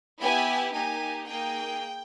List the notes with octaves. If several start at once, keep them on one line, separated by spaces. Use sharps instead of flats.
B3 E4 G4 G#5
A#3 D#4 G4 G#5
A#3 D#4 G#4 G5